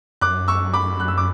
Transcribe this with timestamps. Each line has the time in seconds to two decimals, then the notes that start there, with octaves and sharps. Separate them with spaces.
0.21 F#2 D6 F#6
0.48 C#6 E6
0.73 B5 D6
1.00 F#6
1.08 E6
1.18 D6